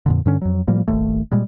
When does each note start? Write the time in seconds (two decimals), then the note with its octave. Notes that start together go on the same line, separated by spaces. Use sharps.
0.06 F2 A#2 D3
0.26 G2 D3 C#4
0.42 F2 F#3
0.67 A2 F3 G3 A#3
0.88 D#1 G#1 D#2 A3
1.32 A#2 G3 G#3